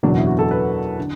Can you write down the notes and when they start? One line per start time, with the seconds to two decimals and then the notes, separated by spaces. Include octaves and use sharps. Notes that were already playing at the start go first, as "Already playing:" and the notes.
0.03 F#1 E2 B2 F#3 D4
0.17 E4
0.27 F#4
0.39 A4
0.51 B4
0.99 D3